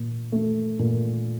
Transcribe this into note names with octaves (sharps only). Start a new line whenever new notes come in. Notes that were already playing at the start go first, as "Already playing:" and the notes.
Already playing: A#2
A3
A#2